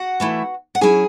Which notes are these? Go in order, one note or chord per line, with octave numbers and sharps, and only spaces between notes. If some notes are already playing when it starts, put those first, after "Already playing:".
Already playing: F#4 F#5
E3 A3 E4
F#5
F#3 C#4 E4 G#4 G#5